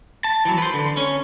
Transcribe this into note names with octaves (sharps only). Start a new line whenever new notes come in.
A5
E3 F#3
B4 C5
D3
C#4